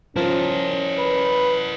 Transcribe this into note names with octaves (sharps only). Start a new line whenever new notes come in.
F3 C#4 E4 A#4
B4